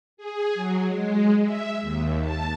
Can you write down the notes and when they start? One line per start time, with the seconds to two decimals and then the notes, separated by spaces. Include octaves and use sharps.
0.17 G#4
0.54 F#3
0.87 G#3
1.44 E5
1.82 D#2
2.21 A5